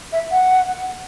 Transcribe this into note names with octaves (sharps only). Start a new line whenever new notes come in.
E5
F#5